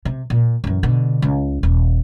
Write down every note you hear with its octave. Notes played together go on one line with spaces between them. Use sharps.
C3
A#2
F#2 E3
B2 D3
C#2
D#1